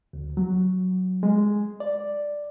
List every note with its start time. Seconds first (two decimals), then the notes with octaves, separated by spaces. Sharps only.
0.13 D2
0.37 F#3
1.23 G#3
1.80 D5